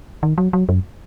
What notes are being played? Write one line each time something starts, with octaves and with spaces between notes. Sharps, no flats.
D#3
F#3
F#3
F#2